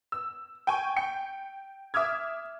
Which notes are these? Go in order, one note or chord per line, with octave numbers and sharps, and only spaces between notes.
E6
G5 G#5 C#6
G5 C#7
E5 D6 D#6 F6 G#6